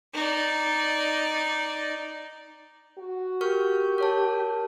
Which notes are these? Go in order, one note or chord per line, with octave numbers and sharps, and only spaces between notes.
D#4 D5
F#4
G4 A#4 C#6 F6
A#4 C#5 A5